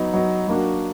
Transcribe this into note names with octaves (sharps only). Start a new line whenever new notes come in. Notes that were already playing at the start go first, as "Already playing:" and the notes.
Already playing: F#3 B3 D#4
F#3 B3 D#4
F#3 A#3 D4 F#4